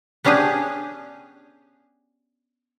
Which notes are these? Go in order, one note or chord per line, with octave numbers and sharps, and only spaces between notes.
B3 C#4 D4 G4 G#4